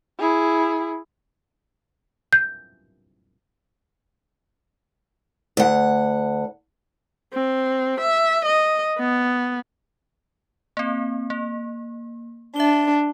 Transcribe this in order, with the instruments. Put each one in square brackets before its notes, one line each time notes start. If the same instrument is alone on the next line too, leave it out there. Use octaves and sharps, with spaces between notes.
[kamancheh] E4 G#4
[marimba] G6
[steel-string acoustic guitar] D2 F#5
[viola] C4
E5
D#5
B3
[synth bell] A#3 C4
A#3
[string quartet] D4 [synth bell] E5 G7